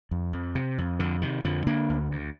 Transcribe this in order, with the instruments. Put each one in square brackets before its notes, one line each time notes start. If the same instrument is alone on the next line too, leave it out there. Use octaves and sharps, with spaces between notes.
[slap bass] F2
F2
C3
F2
F2 D3
C3 D#3
F2 D3 F3
D3 A#3 D4
D2
D2